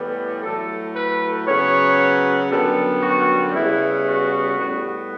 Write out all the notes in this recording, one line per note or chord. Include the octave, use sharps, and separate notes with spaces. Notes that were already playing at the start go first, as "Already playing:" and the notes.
Already playing: A2 E3 G3 B3
A2 F#3 A3 A4
B4
C#3 F#3 B3 C#5
F#2 D3 G3 B3 A4
F#4
C#3 G3 B3 E4
F#4
A2 G3 B3